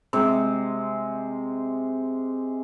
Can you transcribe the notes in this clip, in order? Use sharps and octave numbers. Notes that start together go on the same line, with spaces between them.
C3 G#3